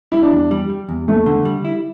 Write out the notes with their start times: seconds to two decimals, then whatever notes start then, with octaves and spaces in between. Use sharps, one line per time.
0.12 G3 E4
0.22 D4
0.32 E2
0.51 G3
0.70 G3
0.89 E2
1.08 E2 A3
1.26 D3
1.45 G3
1.65 E4